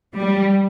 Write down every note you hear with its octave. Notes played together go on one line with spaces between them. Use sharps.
G3